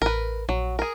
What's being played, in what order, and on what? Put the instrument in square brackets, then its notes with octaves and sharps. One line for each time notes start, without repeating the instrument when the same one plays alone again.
[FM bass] A1 [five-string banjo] A#4 B4
[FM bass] A#1 [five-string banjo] F#3
[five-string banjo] G#4 A#4